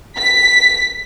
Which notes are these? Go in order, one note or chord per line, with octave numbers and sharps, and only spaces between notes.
B6